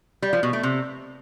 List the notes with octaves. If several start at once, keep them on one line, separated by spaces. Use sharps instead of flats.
G3
F3
B2
A3
C3